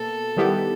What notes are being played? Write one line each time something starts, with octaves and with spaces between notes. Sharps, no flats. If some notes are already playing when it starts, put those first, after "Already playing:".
Already playing: B2 A#3 A4
D#3 G3 B3 E4 G4